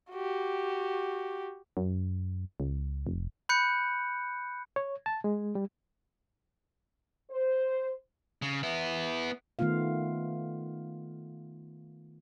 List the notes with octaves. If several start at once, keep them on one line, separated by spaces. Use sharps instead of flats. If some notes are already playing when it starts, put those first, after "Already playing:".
F#4 G4
F#2
C#2
F1
B5 F#6 G6 C#7
C#5
A5
G#3
G3
C5
C#3
B3 E4
D#3 A3 B3 F4 F5